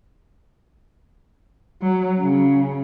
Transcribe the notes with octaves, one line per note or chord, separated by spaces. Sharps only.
F#3
C#3